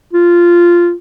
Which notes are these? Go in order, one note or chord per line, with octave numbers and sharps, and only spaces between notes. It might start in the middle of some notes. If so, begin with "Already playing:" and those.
F4